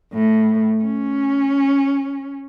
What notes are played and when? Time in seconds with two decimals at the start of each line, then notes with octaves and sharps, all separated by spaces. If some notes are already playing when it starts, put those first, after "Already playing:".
0.13 A2
0.83 C#4